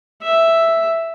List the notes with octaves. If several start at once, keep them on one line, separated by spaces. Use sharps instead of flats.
E5